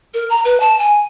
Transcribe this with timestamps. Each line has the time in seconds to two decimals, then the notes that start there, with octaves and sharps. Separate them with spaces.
0.14 A#4
0.30 A#5
0.45 B4
0.60 A5
0.79 G#5